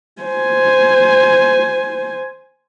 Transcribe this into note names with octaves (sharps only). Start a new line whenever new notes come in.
C5 G#5